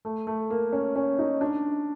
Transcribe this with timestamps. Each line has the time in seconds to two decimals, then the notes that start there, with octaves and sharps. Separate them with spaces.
0.05 A3
0.27 A3
0.50 A#3
0.73 C#4
0.96 C#4
1.19 D#4
1.41 D4